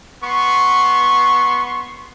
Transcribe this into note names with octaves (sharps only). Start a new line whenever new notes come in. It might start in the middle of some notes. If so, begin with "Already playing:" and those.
B3 C6 C#6